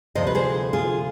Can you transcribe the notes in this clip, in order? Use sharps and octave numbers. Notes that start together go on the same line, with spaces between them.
D2 C3 F3 C5 D#5
B4
G#4 C5
F4 G#4